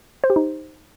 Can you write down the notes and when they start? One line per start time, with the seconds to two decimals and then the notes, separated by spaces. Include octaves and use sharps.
0.24 C5
0.30 G4
0.36 D#4